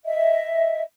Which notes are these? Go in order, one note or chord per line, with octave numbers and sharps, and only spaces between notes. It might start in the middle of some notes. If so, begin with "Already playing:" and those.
D#5 E5